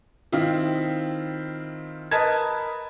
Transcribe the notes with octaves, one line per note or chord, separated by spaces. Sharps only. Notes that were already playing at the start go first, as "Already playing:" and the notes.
D#3 C4 E4 F4
A#4 B4 D#5 A5 G#6